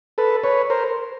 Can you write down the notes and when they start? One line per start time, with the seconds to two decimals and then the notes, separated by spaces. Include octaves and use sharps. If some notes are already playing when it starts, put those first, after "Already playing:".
0.18 A4 B4
0.44 B4 C#5
0.70 A#4 C5